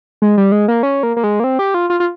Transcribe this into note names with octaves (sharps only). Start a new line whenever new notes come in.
G#3
G3
G#3
A#3
C#4
A#3
A#3
G#3
A#3
C4
G4
F4
F4
F4